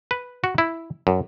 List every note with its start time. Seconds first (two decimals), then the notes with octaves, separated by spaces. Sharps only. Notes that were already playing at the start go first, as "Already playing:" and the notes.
0.11 B4
0.44 F#4
0.58 E4
1.07 F#2